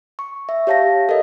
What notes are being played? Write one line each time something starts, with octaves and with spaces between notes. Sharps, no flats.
C#6
E5
G4 C#5 F5 A5 A#6
A4 A#4 D#5